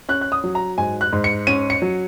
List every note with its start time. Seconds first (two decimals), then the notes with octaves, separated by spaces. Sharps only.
0.09 C#4 F#6
0.21 F#6
0.32 D#6
0.44 F#3
0.55 A#5
0.78 G#2 G#5
1.01 F#6
1.13 G#2
1.24 C#7
1.47 C#4 D#7
1.70 C#7
1.82 F#3